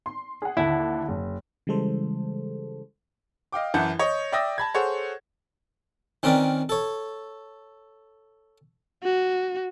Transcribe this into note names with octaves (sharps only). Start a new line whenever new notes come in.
C6
G#4 F#5
D#2 D3 E4
F#1
C#3 E3 G3 G#3 A4 C5
D#5 F5 G5 D6
F#2 E3 F#5 A5 G6
C#5 D#5
D5 E5 G5 D#6 A#6
A5 B5 G#6
G#4 A4 C5 C#5 F#5
D#3 C4 C#4 A#4 B4 D5
A4 C#5
F#4